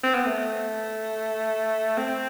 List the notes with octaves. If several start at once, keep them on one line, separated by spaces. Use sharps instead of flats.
C4
B3
A3
C4